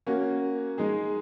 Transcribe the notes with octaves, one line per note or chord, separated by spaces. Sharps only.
A#3 C#4 F#4
G#3 D#4 G#4